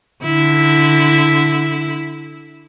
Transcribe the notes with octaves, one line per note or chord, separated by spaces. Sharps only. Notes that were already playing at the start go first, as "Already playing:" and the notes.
D3 E4